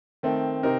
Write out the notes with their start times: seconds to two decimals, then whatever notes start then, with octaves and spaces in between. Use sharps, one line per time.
0.23 D#3 A3 C4
0.63 C3 C4 D#4 A#4